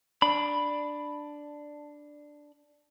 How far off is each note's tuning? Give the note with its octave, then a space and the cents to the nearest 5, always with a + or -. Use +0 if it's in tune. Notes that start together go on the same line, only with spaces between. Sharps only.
D4 +5 B5 +0